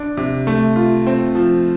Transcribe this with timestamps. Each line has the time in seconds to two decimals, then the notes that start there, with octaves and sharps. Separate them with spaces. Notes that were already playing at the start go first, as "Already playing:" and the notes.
Already playing: D4
0.17 C3
0.47 A3
0.76 F4
1.07 C4
1.35 F3